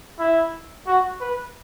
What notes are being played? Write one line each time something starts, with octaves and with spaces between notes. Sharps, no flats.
E4
F#4
B4